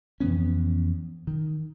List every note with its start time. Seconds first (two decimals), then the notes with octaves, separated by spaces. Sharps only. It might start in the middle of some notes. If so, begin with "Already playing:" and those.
0.20 F2 E3 B3 C#4
1.27 D#3